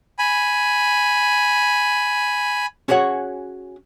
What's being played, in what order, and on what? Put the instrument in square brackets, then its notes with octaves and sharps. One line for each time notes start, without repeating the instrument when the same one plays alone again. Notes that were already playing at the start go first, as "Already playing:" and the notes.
[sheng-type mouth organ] G#5 B5
[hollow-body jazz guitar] C#4 F#4 G#4 C#5 F#5